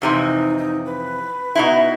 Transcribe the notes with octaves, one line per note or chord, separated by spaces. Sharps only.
F2 C3 E3 D#4
D#4
B4
B2 D#4 E4